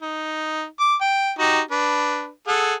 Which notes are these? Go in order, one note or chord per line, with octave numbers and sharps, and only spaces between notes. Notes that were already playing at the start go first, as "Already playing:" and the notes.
D#4
D6
G5
D#4 F#4 G4
D4 B4
G#4 A4 F#5